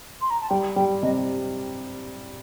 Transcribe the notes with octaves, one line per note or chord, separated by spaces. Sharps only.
C6
A#5
A5
G3 G5
G3 G5
C3 D#5